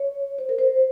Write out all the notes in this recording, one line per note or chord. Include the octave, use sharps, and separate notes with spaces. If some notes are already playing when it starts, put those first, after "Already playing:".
Already playing: C#5
C5
A#4
C5